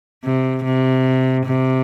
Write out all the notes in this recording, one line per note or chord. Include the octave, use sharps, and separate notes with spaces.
C3
C3
C3